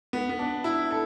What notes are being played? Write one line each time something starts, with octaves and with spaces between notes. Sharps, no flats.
B3
B3
D4
E4
A4